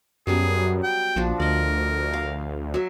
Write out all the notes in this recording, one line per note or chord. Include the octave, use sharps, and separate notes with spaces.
F#2 F#3 G3 B3 G#4
G5
A#1 F3 D4 F#4
D2 A#4 D5 D#5
F5
F#3 E5